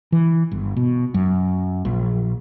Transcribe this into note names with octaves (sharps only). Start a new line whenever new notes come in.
E3
G1
B2
F#2
A#1